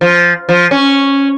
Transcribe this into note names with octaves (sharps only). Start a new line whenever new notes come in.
F3
F3
C#4